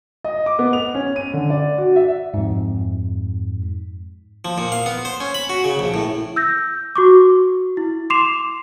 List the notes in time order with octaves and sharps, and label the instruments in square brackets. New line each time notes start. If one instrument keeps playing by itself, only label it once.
[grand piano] D#5
D6
B3
F7
C#4
D#7
D3
D5
F#4
E5
[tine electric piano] F2 G#2
[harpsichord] F3
A#2
F5
B3
C5
C#4
B5
F#4
C#3
A#1
A2
[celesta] E6 G6 A#6
F#4 C#6 D6
E4
C6 D6 C7 E7 F7